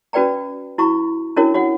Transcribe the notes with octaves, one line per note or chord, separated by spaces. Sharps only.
C#4 F#4 B4 D5 G5 A#5
E4 F#4 A#5 C#6
C#4 D4 E4 F#4 A#4 C#5
F#4 C#5 F#5